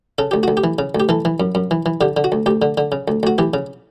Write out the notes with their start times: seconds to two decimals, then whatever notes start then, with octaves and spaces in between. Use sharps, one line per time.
0.18 C#3 A4
0.31 D2 G4
0.43 D2 F#4
0.57 G4
0.64 E3
0.79 C#3
0.95 D2
1.00 G4
1.09 E3 A4
1.25 E3
1.40 F#2
1.55 F#2
1.71 E3
1.86 E3
2.01 D3 G4
2.17 D3
2.24 F#4
2.32 D2
2.46 D2 G4
2.62 D3
2.78 D3
2.92 C#3
3.08 D2
3.23 D2 F#4
3.38 E3 G4
3.54 C#3